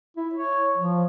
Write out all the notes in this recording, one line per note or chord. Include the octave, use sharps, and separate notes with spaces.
E4
C#5
F3